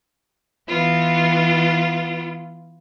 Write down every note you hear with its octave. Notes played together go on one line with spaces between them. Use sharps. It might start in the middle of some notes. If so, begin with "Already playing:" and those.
E3 B3 F4